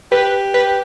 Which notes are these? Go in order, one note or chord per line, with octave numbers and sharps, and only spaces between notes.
G4 B4
B4